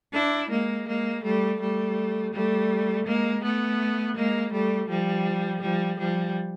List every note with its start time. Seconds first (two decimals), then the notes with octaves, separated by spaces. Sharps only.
0.14 D4 E4
0.50 G#3 A#3
0.87 G#3 A#3
1.24 G3 A3
1.60 G3 A3
2.33 G3 A3
3.06 G#3 A#3
3.43 A3 B3
4.16 G#3 A#3
4.53 G3 A3
4.89 F3 G3
5.62 F3 G3
5.98 F3 G3